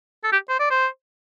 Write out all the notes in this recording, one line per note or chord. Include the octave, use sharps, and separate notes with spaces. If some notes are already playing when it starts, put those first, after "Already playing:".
A4
G4
C5
D5
C5